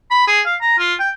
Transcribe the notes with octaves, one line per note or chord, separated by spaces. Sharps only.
B5
G#4
F5
A#5
F4
G5